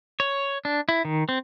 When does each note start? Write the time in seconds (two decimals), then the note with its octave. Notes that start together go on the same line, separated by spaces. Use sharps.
0.20 C#5
0.65 D4
0.89 E4
1.05 D#3
1.29 C4